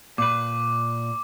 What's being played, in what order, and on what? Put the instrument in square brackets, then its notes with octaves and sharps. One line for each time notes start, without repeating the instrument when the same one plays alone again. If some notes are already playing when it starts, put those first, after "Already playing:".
[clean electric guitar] A#2 B4 [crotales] D6